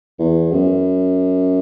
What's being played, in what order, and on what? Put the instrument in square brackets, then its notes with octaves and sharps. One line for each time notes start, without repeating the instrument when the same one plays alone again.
[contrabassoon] E2
F#2